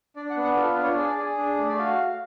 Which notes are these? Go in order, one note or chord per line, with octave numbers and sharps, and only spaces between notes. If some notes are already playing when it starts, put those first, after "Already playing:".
D4 D5
F#5
B3
F#5
F4 A4
B4
D4
C#5
G#4 D5
G#4
D4
A3
D5
F#4 F5